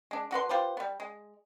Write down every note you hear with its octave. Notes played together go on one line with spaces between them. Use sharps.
G#3 D4
D3 F#4 B4 C6
F4 G4 B4 C5
G3 B3
G#3